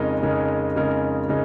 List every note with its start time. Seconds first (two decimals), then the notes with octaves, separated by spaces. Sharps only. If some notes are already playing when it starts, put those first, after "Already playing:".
Already playing: F2 C#3 G#3 D#4 A#4
0.23 F2 C#3 G#3 D#4 A#4
0.76 F2 C#3 G#3 D#4 A#4
1.29 C#3 G#3 D#4 A#4